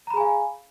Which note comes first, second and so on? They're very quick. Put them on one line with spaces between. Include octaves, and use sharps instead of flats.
A#5 B5 G#4 G#5 F5